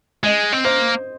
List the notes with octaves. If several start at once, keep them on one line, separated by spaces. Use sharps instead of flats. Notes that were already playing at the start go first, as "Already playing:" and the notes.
G#3 D#5
C4
A#3 C5